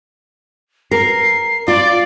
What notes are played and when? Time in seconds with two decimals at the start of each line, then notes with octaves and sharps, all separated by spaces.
0.91 A#4 C7
1.68 F4 D5